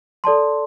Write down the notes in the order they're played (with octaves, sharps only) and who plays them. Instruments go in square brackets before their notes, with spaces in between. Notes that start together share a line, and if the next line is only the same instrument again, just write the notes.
[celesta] A4 D5 A5 C6